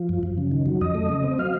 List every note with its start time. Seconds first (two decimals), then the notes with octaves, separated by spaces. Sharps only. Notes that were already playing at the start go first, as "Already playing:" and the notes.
Already playing: F3
0.09 F#2
0.23 F#2
0.38 C#3
0.51 D#3
0.66 F#3
0.81 F2 D#5
0.95 A3
1.09 C#3
1.24 C4
1.39 F#3 F5